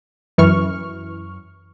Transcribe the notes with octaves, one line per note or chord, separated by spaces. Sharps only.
F#2 E3 C#6 F6